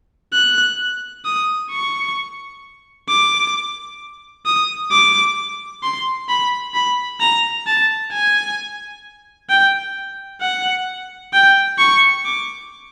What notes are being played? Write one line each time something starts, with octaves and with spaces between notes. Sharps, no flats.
F#6
D#6
C#6
D6
D#6
D6
C6
B5
B5
A#5
A5
G#5
G5
F#5
G5
C#6
D6